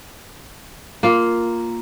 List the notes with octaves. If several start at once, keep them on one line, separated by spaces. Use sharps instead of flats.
A#3 F4